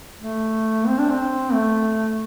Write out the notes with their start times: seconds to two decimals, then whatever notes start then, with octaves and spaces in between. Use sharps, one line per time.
0.20 A3
0.87 C4
0.98 D4
1.10 C4
1.52 A3